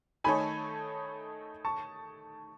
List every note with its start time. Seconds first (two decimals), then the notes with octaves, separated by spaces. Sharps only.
0.24 D#3 A3 D#4 A4 C#5 G#5 B5
1.65 A5 C#6